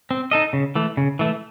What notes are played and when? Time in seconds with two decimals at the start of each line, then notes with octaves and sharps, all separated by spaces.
0.11 C4
0.31 D#4 A4 D#5
0.53 C#3
0.75 E3 A3
0.97 C#3
1.19 E3 A3